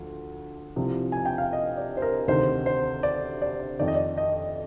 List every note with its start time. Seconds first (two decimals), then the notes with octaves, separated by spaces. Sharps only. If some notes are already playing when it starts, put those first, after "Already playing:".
Already playing: D2 F3
0.76 C2 C3 F3
1.12 G#5
1.25 G5
1.38 F5
1.53 D#5
1.77 D5
1.97 C5
2.02 A#4
2.27 D2 C3 D#3 C5
2.66 C5
3.03 D5
3.42 D5
3.79 F2 D#3 D5
3.88 D#5
3.95 D5
4.17 D#5